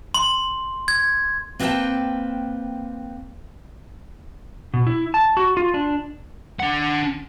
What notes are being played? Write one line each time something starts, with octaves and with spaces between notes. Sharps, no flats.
C6
G#6
A#3 C4 B4 D5 G5 A5
B2
E4
A5
F#4
F4
D4
D4 F#5